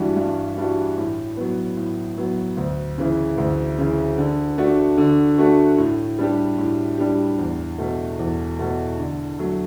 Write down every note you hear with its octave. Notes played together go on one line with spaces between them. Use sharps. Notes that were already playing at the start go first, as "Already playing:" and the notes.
Already playing: G2 E3 G3 D4 F#4
G2
E3 G3 D4 F#4
A2
F#3 B3
A2
F#3 B3
D2
C#3 E3
D2
C#3 E3
D3
A3 D4 F#4
D3
A3 D4 F#4
A2
G3 D4 G4
A2
G3 D4 G4
E2
B2 A3
E2
B2 A3
D3
F#3 A3